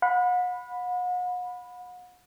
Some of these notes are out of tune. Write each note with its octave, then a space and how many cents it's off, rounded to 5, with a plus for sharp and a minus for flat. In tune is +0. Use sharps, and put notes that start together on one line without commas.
F#5 -40 B5 +0